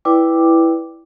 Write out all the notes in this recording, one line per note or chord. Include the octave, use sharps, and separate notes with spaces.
E4 B4 D5 G5 D6